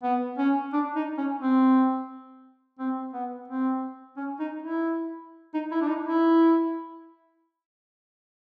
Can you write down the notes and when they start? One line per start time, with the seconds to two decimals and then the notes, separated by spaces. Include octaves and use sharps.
0.03 B3
0.38 C#4
0.73 D4
0.96 D#4
1.18 C#4
1.41 C4
2.79 C4
3.13 B3
3.48 C4
4.17 C#4
4.39 D#4
4.62 E4
5.54 D#4
5.71 E4
5.82 D4
5.88 D#4
6.05 E4